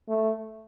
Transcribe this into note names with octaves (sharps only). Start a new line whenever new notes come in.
A3